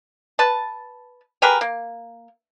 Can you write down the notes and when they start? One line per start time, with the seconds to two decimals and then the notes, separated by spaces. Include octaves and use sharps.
0.39 B4 A5
1.42 G4 G#4 A#4 B4
1.61 A#3